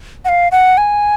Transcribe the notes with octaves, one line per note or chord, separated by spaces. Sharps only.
F#5
F5
F#5
G#5